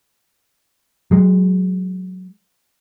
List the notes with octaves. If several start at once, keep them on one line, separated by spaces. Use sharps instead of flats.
F#3 G#3